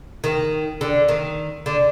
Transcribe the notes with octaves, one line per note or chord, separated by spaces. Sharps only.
D#3
D3
D#3
D3